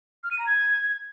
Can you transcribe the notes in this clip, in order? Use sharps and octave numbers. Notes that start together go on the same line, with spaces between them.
F6
D#7
A#5
G#6